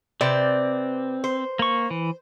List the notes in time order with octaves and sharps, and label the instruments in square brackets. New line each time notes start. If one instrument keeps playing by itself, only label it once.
[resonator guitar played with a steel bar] C3 B4 D5 [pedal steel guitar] C4
[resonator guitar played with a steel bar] C5
[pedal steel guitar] A#3 C#6
E3